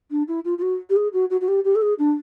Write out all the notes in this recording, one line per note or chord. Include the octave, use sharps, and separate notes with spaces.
D4
E4
F4
F4
F#4
G4
G#4
F#4
F#4
F#4
G4
G4
A4
G#4
D4